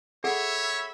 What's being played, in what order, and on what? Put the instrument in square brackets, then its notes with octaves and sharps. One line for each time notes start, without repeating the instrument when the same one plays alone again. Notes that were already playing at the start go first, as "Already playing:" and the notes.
[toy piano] G#4 A4 F#5 [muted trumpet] C#5 [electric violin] E5 B5